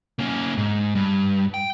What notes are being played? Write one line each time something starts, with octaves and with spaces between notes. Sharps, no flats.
A#3 C#4
G#2
G2
G5